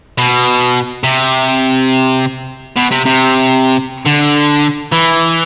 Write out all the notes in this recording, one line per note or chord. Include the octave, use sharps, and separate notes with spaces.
B2
C3
B2
C3
C3
D3
E3